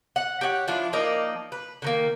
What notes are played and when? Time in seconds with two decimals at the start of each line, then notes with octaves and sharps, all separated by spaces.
0.16 F#5
0.41 G4 C#5 D5 F#5
0.68 F3 D4 E4 F4
0.93 F3 A#3 D#4 D5
1.52 B4
1.82 D3 D#3 A#3